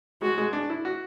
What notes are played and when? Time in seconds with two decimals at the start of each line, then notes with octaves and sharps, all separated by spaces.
0.22 G#3 F#4
0.38 G#3
0.53 D4
0.70 E4
0.85 F#4